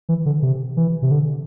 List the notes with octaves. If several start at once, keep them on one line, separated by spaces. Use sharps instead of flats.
E3
D3
C3
E3
C3
D3